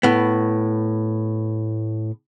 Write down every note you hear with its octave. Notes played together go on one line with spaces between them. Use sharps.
A2 B3